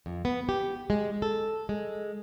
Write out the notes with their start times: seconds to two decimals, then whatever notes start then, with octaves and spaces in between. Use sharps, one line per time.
0.06 F2
0.25 B3
0.49 G4
0.90 G#3
1.22 A4
1.69 G#3